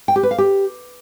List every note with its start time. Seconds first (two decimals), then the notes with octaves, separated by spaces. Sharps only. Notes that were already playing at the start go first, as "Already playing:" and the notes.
0.08 G5
0.16 G4
0.23 B4
0.31 F5
0.38 G4